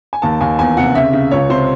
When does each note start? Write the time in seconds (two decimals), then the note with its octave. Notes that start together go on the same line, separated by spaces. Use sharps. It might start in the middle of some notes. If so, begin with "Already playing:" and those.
0.13 G#5
0.22 D#2 A5
0.40 D#2 G#5
0.59 E2 G#5
0.77 C3 F#5
0.95 C#3 E5
1.13 C#3
1.31 C#2 C#5
1.49 C3 C5